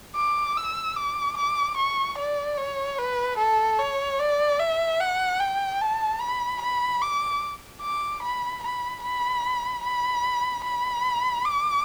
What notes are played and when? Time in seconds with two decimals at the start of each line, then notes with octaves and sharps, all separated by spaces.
0.16 D6
0.57 E6
0.97 D6
1.37 D6
1.77 C#6
2.18 D5
2.58 C#5
2.99 B4
3.39 A4
3.79 C#5
4.20 D5
4.60 E5
5.01 F#5
5.40 G5
5.81 A5
6.21 B5
6.62 B5
7.02 D6
7.82 D6
8.23 B5
8.63 B5
9.03 B5
9.84 B5
10.64 B5
11.45 D6